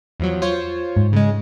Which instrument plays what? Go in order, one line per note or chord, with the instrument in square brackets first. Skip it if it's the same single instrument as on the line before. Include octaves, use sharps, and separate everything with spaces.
[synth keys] E2 F3 F#3
F4 C5 C#5
[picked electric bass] G#2
[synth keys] C#3 G#3